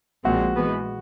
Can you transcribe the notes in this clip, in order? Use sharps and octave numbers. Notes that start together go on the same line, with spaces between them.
A#1 A#2 F3 G#3 C4 F#4
E3 G#3 B3